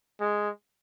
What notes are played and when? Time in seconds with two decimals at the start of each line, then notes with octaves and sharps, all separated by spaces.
0.20 G#3